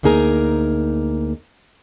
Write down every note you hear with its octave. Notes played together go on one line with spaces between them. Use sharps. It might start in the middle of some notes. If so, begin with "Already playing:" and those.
D2 A#3 D#4 G#4 A#4